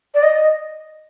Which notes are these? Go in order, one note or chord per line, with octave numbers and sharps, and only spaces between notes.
D5
D#5